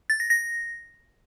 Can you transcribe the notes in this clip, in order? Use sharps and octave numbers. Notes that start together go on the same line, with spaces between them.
A6
A#6
A#6